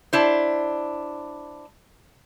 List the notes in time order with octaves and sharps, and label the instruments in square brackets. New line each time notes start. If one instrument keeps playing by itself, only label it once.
[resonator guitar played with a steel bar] D4 E4 C5